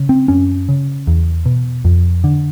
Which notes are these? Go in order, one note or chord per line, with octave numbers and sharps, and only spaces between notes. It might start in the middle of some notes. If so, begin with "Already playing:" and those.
Already playing: C#3
C4
F#2 C#4
C#3
E2
B2
F2
D3